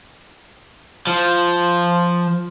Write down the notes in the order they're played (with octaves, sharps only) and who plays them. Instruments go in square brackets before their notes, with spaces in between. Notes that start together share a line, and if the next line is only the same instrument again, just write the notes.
[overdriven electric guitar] F3